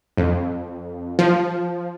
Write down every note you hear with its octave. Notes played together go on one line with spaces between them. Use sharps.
F2
F3